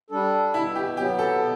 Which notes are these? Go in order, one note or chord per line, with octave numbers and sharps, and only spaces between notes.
G3 D4 A4
B2 E4
G4
F#3 B3 G4
A4
B2